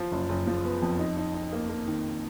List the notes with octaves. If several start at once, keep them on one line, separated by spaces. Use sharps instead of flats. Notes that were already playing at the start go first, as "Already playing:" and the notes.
Already playing: F3
F#1
F#1
F3
B3
F2
D#4
D#4
D#4
A#3
A#3
D#3